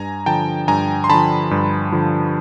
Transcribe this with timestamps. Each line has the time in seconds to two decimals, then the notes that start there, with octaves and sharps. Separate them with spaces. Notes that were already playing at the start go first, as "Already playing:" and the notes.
Already playing: G2 G#5 A#5
0.26 D3 F3 G5 A5
0.68 G2 G#5 A#5
1.04 C6
1.10 D3 F3 A5 B5
1.51 G2
1.92 D3 F3